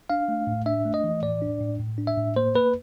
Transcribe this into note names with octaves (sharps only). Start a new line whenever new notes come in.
D4 F5
A3
A2
D4 E5
A3
D#5
E3
A2 D5
D4
A2
A2
D4
E5
A2
A#3 C5
A#3 B4